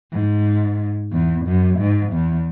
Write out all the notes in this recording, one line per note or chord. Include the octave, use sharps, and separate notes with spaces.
G#2
E2
F#2
G#2
E2